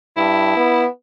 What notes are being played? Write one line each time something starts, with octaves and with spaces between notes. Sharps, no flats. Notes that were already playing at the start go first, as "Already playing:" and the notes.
G2 E4
B3